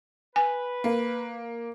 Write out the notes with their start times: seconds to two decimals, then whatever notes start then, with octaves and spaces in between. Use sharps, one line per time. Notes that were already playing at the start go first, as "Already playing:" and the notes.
0.36 B4 G#5
0.84 A#3